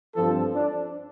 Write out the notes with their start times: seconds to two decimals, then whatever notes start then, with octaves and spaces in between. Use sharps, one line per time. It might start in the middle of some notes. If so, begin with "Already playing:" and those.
0.15 G2 F3 C4 A4
0.54 D4